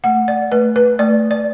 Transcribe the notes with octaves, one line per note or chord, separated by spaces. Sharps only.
A3 F#5
D5
A3 B4
B4
A3 D5
D5